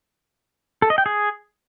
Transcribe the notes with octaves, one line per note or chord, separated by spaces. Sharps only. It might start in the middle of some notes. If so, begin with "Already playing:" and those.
A4
D#5
G5
G#4